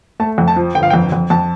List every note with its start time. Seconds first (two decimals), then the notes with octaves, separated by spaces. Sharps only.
0.20 A3 A5
0.38 F2
0.48 A5
0.57 F3
0.75 G1 G5
0.83 F5
0.90 F2 G5
1.12 F2
1.30 F2 A5